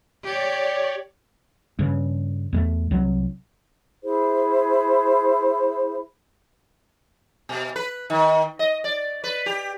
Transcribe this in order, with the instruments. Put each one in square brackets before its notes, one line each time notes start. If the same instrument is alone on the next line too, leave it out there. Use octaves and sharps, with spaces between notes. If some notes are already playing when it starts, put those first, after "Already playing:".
[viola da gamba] G4 [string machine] C#5 D5
[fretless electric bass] G2 C#3
E2 G#3 A3
C2 F#3
[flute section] E4 G#4 C5
[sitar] B2
B4
D#3
D#5
D5
B4
G4